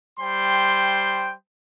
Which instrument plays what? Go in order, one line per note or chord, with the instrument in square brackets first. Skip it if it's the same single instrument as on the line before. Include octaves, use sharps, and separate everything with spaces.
[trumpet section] G3 C5 G5 C6